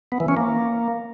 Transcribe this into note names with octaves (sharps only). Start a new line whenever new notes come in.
B3
E3
C#4
A#3